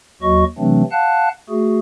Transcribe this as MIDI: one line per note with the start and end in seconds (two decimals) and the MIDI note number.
0.22 0.44 39
0.22 0.44 54
0.22 0.44 66
0.22 0.44 75
0.22 0.44 85
0.59 0.83 48
0.59 0.83 52
0.59 0.83 54
0.59 0.83 57
0.59 0.83 60
0.59 0.83 62
0.91 1.29 77
0.91 1.29 78
0.91 1.29 81
0.91 1.29 90
1.49 1.79 57
1.49 1.79 66
1.49 1.79 68